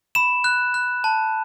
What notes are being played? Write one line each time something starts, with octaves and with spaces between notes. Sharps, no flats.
B5 E7
F#6
F#6
A5